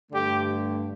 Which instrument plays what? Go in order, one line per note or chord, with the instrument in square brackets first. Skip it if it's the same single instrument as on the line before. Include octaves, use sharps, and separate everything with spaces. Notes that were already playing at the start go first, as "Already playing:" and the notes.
[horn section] G2 D3 A3 G4